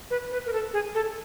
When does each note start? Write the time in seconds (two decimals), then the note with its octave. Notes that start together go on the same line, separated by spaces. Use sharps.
0.10 B4
0.32 B4
0.46 A#4
0.53 A4
0.73 G#4
0.94 A4